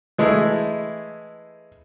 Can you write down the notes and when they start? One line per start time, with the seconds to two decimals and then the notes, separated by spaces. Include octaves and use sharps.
0.18 E3 G#3 A3 E4